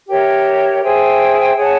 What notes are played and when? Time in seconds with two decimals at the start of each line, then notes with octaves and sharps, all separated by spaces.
0.06 G4 A#4 C#5 E5
0.81 G#4 C5 E5 G5
1.56 G#4 C#5 F#5 A5